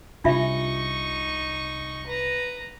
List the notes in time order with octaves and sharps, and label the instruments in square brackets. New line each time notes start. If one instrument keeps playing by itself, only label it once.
[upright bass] C2 C3 [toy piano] D4 F4 E5 [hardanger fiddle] D#4 C#6
[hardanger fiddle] B4 A#5